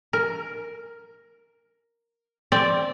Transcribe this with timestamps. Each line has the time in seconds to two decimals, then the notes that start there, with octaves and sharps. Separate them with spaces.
0.13 A#4
2.52 C4 D5